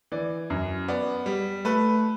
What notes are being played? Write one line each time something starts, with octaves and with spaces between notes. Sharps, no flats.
E3 D5
F#2
B3 D5
G3
A3 B4